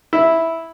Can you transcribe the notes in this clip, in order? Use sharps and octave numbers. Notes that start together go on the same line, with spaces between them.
E4